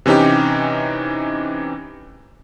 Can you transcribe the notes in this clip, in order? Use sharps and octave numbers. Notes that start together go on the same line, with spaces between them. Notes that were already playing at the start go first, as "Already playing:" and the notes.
C3 E3 C#4 D#4 G4